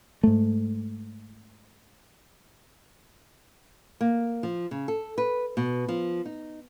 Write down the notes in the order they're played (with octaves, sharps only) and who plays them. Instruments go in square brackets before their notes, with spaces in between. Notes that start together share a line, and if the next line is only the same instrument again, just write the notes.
[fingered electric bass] G#2 A3
[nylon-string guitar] A#3
F3
C#3
A4
B4
B2
F3
D#4